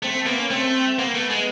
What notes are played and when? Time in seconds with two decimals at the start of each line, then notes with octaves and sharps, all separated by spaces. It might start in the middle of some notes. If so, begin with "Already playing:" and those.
0.03 A3 C4
0.15 C4
0.26 A#3 B3
0.39 C#4
0.50 A3 C4
0.98 A#3 B3
1.14 A3
1.30 G#3